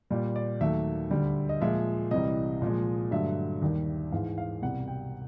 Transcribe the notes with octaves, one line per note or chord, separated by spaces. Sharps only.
A#2 G3
D5
D#2 D#3 F#3 A3 E5
D2 D3 G3
D#5
A#2 F3 G#3 E5
C2 C3 E3 G3 D#5
A#2 F3 G#3
G2 D3 F#3 A3 E5
D#2 D#3 G3
G#2 E3 G#3 F5
F5
C2 B2 G3 F#5
G5